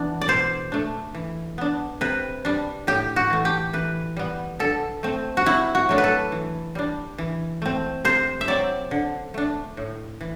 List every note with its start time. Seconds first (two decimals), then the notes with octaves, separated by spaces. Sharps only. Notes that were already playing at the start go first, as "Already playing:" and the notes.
Already playing: E3 B3 D4
0.21 D5
0.28 B2 C5
0.72 A3 D4
1.14 E3
1.58 B3 D4
2.01 C3 B4
2.45 G3 D4
2.87 A2 G4
3.16 F#4
3.30 E3 A3
3.45 G4
3.73 E3 B4
4.17 G3 B3
4.59 D3 A4
5.03 A3 C4
5.37 F#4
5.46 C3 E4
5.75 F#4
5.89 F#3 A3 D4
5.98 B4
6.04 A4
6.32 E3
6.75 G3 D4
7.18 E3
7.62 A3 C4
8.05 C3 C5
8.41 E5
8.48 F#3 C4 D5
8.91 D3
9.34 A3 D4
9.77 A2
10.21 E3